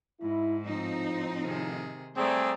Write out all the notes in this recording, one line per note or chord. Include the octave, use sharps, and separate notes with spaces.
G#2 E4
A2 F3 C4 D#4
C3 D#3 G#4
G3 A3 C4 G#4 C5 D5 A#5